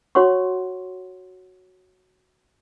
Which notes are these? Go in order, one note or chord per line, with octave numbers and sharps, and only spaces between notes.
F#4 C#5 F#5 C6 C#6